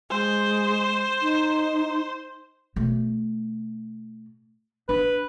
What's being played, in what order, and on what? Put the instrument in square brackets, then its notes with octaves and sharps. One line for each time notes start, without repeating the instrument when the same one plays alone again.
[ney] G#3 [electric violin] C5
[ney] D#4
[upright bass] B2 A3
[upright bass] D4 [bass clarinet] B4